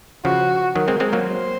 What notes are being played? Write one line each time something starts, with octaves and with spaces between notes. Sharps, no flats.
C#3 F3 F#4
D#3 F#3 A#4
G#3 C4
G#3 C4
F#3 A#3
C5